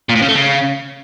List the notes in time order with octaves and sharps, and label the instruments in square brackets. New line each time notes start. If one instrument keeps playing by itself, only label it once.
[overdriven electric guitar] A#2
A2
C#3
A3
C#3